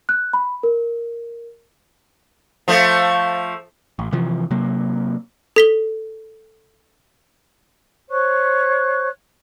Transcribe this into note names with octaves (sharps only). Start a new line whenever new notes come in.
F#6
B5
A#4
F3 A3
A1
C3 E3 F3
C3 F#3 A#3
A4 B6 G7
C5 C#5 C#6 F#6